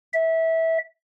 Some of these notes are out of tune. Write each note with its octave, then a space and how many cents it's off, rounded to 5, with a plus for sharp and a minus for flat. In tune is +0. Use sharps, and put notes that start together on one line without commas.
E5 -20